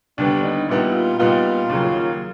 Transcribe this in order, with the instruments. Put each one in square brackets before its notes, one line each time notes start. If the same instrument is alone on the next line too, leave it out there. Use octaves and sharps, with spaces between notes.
[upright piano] D#2 D3 G3 B3 [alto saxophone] D4
[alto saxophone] D#4
[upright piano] A#2 G3 B3 D#4 [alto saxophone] E4
[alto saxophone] F4
[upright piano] A#2 G3 B3 D#4 [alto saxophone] F4
[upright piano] D#2 C#3 F#3 A#3